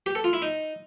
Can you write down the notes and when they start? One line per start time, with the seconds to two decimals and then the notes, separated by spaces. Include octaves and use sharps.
0.06 G4
0.15 A4
0.24 F4
0.33 E4
0.42 D#4